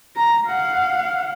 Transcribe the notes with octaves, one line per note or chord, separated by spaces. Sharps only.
A#5
F5 F#5